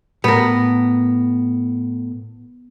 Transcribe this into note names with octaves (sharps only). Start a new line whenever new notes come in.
A2 B3 A#4